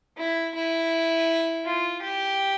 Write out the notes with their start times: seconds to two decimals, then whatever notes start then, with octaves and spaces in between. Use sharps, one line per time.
0.17 E4
0.55 E4
1.65 F4
2.02 G4